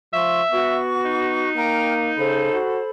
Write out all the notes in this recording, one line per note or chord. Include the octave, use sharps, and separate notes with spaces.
F3 E5 C6 C#6
B3 F#4 C#6
D#4
A#3 G5 A#5 F6
C#3 A4 C5 B5
F#4